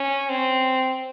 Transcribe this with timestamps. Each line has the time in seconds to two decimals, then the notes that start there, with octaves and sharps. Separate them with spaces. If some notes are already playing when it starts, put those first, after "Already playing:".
Already playing: C#4
0.30 C4